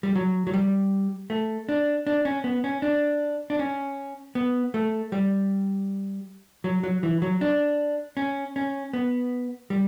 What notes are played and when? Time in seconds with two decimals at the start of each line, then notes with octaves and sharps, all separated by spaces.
0.03 G3
0.16 F#3
0.47 F#3
0.53 G3
1.30 A3
1.69 D4
2.07 D4
2.25 C#4
2.44 B3
2.64 C#4
2.82 D4
3.50 D4
3.59 C#4
4.35 B3
4.74 A3
5.12 G3
6.64 F#3
6.83 F#3
7.03 E3
7.22 F#3
7.41 D4
8.17 C#4
8.56 C#4
8.93 B3
9.70 G3